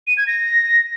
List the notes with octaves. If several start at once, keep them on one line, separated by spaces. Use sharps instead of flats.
D#7
G#6
A#6